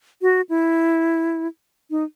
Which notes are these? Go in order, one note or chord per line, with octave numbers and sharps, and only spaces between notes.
F#4
E4
D#4